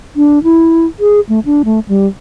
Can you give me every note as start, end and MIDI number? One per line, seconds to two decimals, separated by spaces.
0.16 0.42 62
0.44 0.86 64
1.00 1.20 68
1.29 1.40 57
1.45 1.62 62
1.65 1.80 57
1.88 2.07 55